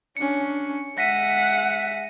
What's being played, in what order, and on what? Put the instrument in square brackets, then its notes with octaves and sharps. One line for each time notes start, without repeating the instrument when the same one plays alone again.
[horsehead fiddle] C#4 D4 [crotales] C#7
[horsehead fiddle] G#3 E5 [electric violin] F#5 [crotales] A#6 B6 D#7